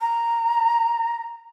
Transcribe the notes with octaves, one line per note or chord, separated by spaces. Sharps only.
A#5